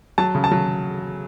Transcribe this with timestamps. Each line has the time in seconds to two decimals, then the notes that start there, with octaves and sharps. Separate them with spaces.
0.18 F#3 A5
0.35 C#3
0.44 A5
0.51 F#3